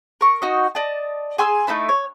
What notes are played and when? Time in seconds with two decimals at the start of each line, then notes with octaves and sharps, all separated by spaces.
0.21 A#4 C#6
0.42 D#4 F#4 D#5
0.75 D5 D#5 A5
1.38 G#4 G#5 C6 E6
1.67 A3 D#4 E4 A5
1.89 C#5